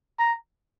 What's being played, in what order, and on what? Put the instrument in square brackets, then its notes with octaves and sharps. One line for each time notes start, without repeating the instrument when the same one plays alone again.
[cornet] A#5